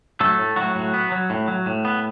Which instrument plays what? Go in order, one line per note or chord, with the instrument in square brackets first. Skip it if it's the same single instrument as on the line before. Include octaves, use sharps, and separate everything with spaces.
[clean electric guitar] F#3 A3 A4
A2
A2 F#3 F#4
A2
B3
F#3
A2
F#3
A2
B3